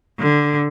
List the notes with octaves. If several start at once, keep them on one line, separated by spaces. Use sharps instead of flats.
D3